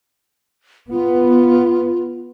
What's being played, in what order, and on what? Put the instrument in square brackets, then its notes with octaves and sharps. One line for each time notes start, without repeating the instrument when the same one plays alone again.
[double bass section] B3 [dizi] F4